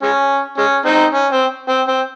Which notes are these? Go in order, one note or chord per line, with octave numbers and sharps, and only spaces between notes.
G#3 C#4
G#3 C#4
C4 D#4
C#4
C4
C4
C4